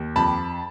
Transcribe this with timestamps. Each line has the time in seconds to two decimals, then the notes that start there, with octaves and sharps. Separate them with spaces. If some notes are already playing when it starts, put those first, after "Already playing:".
Already playing: D#2
0.16 F2 A5 B5